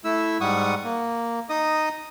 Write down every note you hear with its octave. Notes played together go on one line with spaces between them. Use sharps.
A3 E4 E6
G#2 G3 F#5 C#6 D#6
A#3
D#4 D#5 D#6